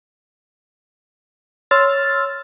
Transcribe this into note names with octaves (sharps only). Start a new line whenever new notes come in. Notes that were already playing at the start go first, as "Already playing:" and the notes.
C#5 C6 E6 F6 A6